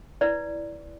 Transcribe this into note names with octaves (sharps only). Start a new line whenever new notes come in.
E4 B4 D5